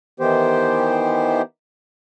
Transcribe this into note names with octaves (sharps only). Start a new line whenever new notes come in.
D#3 E3 B3 G4 C5